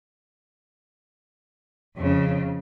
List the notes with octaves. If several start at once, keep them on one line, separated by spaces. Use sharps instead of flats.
F2 C#3